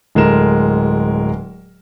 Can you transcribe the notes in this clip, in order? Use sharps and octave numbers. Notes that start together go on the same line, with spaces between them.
D1 G#3 A3 A#4 E7